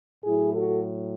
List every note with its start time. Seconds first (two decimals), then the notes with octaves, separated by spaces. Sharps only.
0.24 A2 F#3 E4 G#4
0.52 F#4 A4